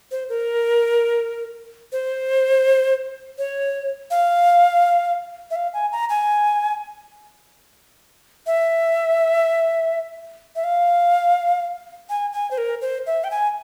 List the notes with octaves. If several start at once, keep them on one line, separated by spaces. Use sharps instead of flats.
C5
A#4
C5
C#5
F5
E5
F5
G#5
A#5
G#5
E5
E5
F5
G#5
G#5
C5
A#4
C5
E5
G5
G#5